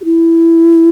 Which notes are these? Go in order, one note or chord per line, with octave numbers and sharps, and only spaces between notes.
G4
E4